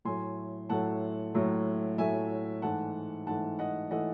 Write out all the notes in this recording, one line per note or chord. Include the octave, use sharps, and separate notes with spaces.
A2 F#3 A3 G#5 C6
A2 F#3 A3 F#5 A5
A2 F#3 A3
A2 F#3 A3 E5 G#5
G#2 E3 A3 F#5 A5
G#2 E3 A3 F#5 A5
D#5 F#5
E3 A3 D#5 F#5